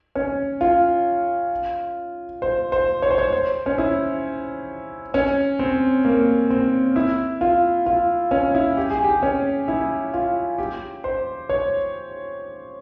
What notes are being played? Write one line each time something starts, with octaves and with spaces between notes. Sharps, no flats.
C#4
F4
C5
C5
C#5
C5
C#5
C5
C#4
E4
C#4
C4
A#3
C4
E4
F4
F4
C#4
E4
G4
G#4
G4
C#4
E4
F4
G4
C5
C#5